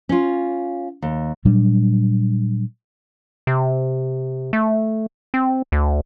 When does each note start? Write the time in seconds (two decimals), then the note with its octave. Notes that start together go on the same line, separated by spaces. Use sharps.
0.09 C#4 F4
1.02 D#2
1.45 A#2 F#3 G3 D4
3.47 C3
4.53 A3
5.34 C4
5.72 D2